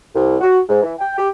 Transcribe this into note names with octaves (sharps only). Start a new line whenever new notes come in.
C2
F#4
G#2
E3
G5
G4